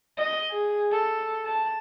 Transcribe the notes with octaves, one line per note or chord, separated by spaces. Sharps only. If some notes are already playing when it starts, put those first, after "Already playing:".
D#5
G#4
A4
A5